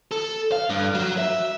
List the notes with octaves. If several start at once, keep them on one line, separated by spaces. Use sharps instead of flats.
A4
F5
G2
F#3
E5